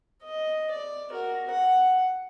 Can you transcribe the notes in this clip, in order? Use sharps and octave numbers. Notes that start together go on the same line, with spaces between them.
D#5
D5
F#4 A#4
F#5